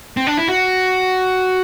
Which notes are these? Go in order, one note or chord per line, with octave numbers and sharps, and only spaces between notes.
C4
D4
E4
F#4